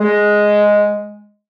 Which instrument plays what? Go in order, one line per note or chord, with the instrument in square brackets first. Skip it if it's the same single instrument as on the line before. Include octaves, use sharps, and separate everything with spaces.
[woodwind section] G#3